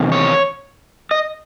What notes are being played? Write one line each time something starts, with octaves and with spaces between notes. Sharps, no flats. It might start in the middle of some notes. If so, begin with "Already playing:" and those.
Already playing: E2 C3 D#3
C#5
D#5